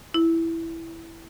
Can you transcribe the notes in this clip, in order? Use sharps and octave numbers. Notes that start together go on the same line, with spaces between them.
E4